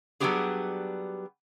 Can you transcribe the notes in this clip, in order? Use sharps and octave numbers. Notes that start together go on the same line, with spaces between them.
F#3 G3 B3 D4 G4 G#4